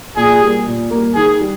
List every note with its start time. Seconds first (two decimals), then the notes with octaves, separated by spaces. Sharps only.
0.17 A#2 G#4
0.41 G3 A#3
0.66 A#2
0.91 G3 A#3
1.15 D#3 G#4
1.40 G3